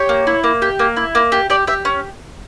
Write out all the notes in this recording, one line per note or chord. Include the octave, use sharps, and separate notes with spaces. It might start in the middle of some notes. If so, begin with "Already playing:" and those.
Already playing: G4 C#5
A#3
E4
A#3
G4
A#3
E4
A#3
G4
G4 D5
G4 E5
C#4